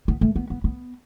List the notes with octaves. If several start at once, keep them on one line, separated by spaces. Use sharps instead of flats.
B3
A3
B3
B3
B3